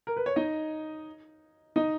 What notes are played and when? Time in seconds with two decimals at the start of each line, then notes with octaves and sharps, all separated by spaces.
0.07 A#4
0.17 B4
0.26 C#5
0.36 D#4 D#5
1.76 D#4 D#5